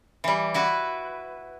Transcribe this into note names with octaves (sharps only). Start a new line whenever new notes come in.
E3 G3
E4 F#4 B4